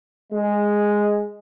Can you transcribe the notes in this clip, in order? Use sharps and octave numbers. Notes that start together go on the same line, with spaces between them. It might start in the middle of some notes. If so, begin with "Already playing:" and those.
G#3